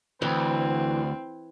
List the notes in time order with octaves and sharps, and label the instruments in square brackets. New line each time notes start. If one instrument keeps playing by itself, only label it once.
[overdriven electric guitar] D2 [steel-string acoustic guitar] E3 [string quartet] C4